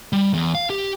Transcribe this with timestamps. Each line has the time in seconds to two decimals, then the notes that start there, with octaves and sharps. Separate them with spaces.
0.13 G3
0.33 E2
0.55 F5
0.70 G4